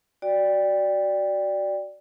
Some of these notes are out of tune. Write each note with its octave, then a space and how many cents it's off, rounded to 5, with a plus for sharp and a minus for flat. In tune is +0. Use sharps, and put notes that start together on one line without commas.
F#4 +10 D5 +0 G5 +15